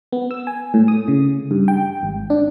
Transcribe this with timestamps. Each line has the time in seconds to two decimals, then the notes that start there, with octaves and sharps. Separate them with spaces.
0.12 B3
0.31 E6
0.47 G#5
0.74 A2
0.88 D#6
1.08 C#3
1.51 G2
1.68 G5
2.03 G#1
2.30 D4